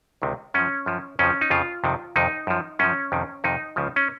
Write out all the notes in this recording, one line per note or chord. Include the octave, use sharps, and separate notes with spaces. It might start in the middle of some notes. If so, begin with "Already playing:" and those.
C#2 C3 D#3
F#2 F3 C#4
F#2 F3
F2 C#3 F3 C#4
D#4
F2 C#3 F3 F4
F2 C3 D#3
F2 C3 D#3 D#4
F#2 F3
F#2 F3 C#4
F2 C3 D#3
F2 C3 D#3 D#4
C#2 C#3 F3
C#4